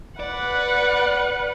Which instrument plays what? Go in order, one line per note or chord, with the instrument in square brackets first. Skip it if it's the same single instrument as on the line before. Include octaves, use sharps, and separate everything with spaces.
[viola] B4 F#5 [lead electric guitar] D5